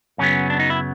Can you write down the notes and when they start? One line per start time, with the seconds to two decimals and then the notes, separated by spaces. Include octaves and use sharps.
0.18 F#2 C#3 F#3 B3 C#4
0.50 D4
0.60 D#4
0.70 E4